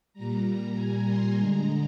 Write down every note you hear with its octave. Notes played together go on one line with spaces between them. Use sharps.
A#2 G3 A#5
G#5
C6
D3 G#3 A#5